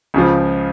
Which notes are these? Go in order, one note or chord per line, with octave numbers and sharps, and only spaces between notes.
C#2 C#3 F3